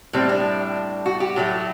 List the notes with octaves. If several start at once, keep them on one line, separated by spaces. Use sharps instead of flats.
A2 G3 C4
D4
F#4
G4
A2 F#3 A3